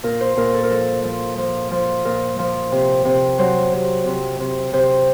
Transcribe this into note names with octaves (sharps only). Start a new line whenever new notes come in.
A#2 A#4
C5
A#2 A#4
A4
A#4
F3 A4
F3
F3
F3
A#2 A#4
F3
C3
C3
F#3 C5
C3
C3
C3
C3 C5